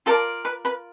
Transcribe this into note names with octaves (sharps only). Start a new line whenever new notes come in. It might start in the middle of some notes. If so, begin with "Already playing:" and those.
F4 A4 A#4 D5 A5
B4 B5
B4 B5